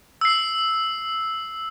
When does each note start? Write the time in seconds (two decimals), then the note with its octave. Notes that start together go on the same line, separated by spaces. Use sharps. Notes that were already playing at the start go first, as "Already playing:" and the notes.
0.21 E6 C7